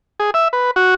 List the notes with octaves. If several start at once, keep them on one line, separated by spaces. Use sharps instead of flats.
G#4
E5
B4
F#4